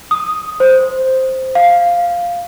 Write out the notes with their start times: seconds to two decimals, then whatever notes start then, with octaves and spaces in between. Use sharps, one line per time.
0.11 D#6
0.60 C5
1.55 F5